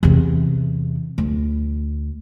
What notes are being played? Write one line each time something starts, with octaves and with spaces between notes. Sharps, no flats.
E2 C3
D2